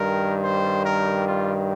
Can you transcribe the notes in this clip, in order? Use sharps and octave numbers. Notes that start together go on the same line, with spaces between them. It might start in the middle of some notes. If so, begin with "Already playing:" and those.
Already playing: G2 D#3 G3 A#4
C5
A#4
F4